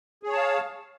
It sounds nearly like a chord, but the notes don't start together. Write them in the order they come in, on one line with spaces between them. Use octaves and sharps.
G#4 C#5 A5 F5